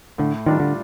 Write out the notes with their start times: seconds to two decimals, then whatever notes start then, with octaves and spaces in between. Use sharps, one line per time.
0.18 A2 D3
0.46 D#3 G3 D4 F4
0.60 D3